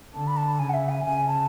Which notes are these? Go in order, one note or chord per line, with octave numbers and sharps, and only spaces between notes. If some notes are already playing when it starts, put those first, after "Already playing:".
D3 A5
B5
A5
C#3 G#5
F#5
E5
G#5
C#3 G#5
A5